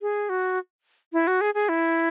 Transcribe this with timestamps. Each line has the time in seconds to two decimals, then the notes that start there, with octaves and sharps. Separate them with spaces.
0.02 G#4
0.29 F#4
1.13 E4
1.27 F#4
1.41 G#4
1.54 G#4
1.69 E4